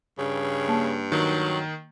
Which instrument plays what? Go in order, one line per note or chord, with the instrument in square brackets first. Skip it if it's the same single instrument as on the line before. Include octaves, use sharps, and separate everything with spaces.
[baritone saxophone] G2 [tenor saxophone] C#3
[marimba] A#3 A5
[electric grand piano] D#3 [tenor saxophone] F#3